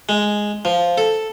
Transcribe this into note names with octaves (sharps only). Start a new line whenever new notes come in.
G#3
F3
A4